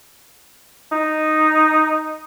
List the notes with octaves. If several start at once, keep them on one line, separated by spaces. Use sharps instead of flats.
D#4